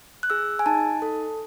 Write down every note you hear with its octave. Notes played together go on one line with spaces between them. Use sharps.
F#6
G#4 E6
G#5
D#4 A5
A4